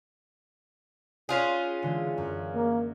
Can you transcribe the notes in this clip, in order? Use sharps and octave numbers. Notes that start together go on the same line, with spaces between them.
C#4 F4 G#4 F#6
D3 E3 G#3
F#2
A#3